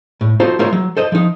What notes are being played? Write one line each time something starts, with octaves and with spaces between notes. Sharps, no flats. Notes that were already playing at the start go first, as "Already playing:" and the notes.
A2
D#4 F4 F#4 A4 C5 A#5
A3 D#4 F4 A#4 C5 C#5
F#3
A4 C5 D#5
F3 D#4